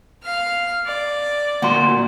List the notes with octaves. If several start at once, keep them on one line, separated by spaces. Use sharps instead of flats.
F5 F6
D5
D2 A#2 F#4 C6